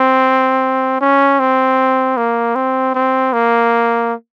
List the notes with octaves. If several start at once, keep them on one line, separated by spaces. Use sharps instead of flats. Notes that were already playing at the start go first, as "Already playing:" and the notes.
Already playing: C4
C#4
C4
A#3
C4
C4
A#3